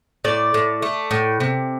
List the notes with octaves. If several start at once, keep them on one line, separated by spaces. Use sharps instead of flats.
A2 D5
A2
A3
A2
C3